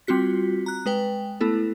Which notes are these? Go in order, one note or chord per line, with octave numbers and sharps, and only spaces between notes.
G3 C4 F4 F#4 B6
A#5 F#6
G#3 B4 G5
A3 B3 E4 A4